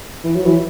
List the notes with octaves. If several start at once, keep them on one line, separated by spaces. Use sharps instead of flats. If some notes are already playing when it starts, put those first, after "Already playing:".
E3
F#3
E3